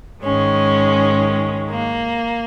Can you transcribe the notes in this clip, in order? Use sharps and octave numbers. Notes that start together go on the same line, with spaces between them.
G#2 D#3 G#3 C#4
A#3